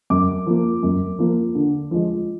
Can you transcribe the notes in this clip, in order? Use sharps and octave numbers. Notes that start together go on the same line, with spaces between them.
F#2 D6
F3 A#3
F#2
F3 A#3
D3
F3 G#3